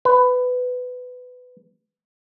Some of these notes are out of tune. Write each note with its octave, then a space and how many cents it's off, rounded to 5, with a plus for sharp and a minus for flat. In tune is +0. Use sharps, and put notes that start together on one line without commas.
B4 +15